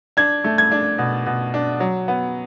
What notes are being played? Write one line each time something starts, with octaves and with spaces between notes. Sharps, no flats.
D4 G#6
A3
G#6
D4
B2
B2
D4
F#3
B3